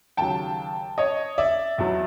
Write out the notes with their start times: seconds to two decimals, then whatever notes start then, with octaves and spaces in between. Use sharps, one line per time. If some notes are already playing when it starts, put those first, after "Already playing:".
0.17 D#2 C#3 F#3 G5 A5
0.98 C#5 D#5
1.38 D5 E5
1.78 E2 B2 F#3